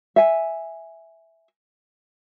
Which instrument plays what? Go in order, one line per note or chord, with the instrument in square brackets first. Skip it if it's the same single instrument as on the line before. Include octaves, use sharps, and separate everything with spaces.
[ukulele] E5 G#5